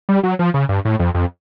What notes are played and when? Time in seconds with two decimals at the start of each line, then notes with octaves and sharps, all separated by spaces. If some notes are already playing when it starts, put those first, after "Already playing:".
0.09 G3
0.23 F#3
0.39 F3
0.54 C#3
0.69 G2
0.85 A2
0.99 F2
1.15 F2